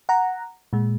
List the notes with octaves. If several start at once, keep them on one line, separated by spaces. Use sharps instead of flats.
F#5 A#5
A#2 G#3